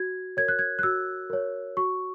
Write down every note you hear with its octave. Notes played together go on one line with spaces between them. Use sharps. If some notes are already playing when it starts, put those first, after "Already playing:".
Already playing: F#4 G#6
A#4 C#5 G#6
F#6
G#6
F#6
F#4 E6
A#4 C#5
F#4 C#6